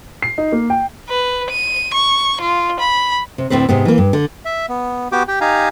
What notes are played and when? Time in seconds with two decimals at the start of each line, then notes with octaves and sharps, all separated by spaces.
0.22 C7
0.38 D#4
0.52 A#3
0.70 G5
1.09 B4
1.50 D#7
1.94 C#6
2.41 F4
2.80 B5
3.38 C3
3.50 D2 A2 C4 B4 C5
3.69 G#2 C3 B3
3.85 E3 A#3
3.98 G2
4.13 D3
4.45 E5
4.69 B3
5.12 B3 F#4 G4 G5 D6
5.28 G4 G5
5.41 D#4 G4 F5 G#5 A#5